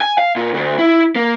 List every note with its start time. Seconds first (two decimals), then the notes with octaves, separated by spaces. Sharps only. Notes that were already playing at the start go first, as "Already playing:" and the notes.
0.01 G#5
0.18 F5
0.36 A#2
0.54 D2
0.79 E4
1.16 A#3